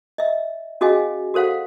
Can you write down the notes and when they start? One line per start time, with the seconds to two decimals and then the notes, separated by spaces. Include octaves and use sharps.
0.18 D#5 E5
0.81 C#4 F#4 G#4 D#5 F5 G#5
1.34 F#4 A4 C5 F5 F#5